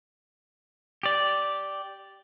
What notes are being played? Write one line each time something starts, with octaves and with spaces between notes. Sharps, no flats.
G4 D5